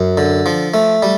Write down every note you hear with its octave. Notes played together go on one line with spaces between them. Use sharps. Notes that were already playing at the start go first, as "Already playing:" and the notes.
Already playing: F#2
D3
F3
A3
G3